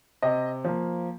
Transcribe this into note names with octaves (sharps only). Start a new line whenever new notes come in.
C3 D#5
F3 A#3